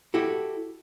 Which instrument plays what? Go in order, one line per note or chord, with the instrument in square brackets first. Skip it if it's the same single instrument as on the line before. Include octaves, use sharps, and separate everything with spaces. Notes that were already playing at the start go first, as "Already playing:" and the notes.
[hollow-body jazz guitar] E4 F#4 G4 A4